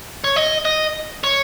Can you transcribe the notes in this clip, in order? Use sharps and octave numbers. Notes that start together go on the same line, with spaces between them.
C#5
D#5
D#5
C#5